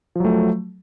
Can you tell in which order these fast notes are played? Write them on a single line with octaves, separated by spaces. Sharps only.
F3 F#3 A3